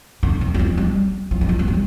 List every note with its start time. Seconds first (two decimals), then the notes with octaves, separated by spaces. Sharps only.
0.23 D3
0.41 D#3
0.54 G3
0.59 F3
0.77 G3
1.31 F3
1.41 D#3
1.49 F3
1.59 F3
1.68 G3